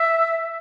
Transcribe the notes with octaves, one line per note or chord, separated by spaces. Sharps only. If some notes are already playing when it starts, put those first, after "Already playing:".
Already playing: E5